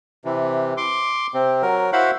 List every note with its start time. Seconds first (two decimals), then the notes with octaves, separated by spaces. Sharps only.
0.25 C3 E3
0.77 C6 D6
1.34 C3 C4
1.62 F#3 A#4
1.93 E4 F#4 C5 F5 F#5 B5